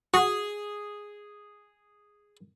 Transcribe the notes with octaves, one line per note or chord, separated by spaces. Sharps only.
F#4 G#4